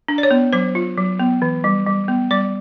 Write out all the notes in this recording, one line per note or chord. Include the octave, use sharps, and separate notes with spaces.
D4
D5
C#5
B3
F#3 C5
F4
F#3
B3
E3
G3
G3
B3
G3 D5